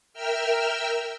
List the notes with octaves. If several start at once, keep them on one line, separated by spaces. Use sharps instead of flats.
A#4 E5 G5 E6 F6